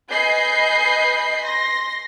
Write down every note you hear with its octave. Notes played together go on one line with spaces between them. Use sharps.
B4 D#5 G#5 B5 G6 C7
C6 A#6